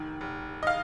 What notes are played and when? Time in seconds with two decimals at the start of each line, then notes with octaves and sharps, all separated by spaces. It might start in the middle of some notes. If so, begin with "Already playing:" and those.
Already playing: F1 D#3
0.21 F1
0.63 D#5
0.67 F5